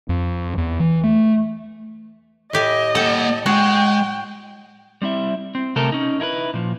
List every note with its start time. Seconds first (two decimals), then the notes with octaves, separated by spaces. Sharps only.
0.09 F2
0.58 E2
0.80 E3
1.03 A3
2.53 A2 G4 D#5 G#5
2.95 A#3 A4 F#5 G5
3.46 G#3 F#4 G5
5.02 G3 C4 E4 E5
5.55 C4
5.76 C3 A3 A4 A#4
5.92 C#4 D#4
6.20 D#4 E4 A4 B4
6.54 A#2 F3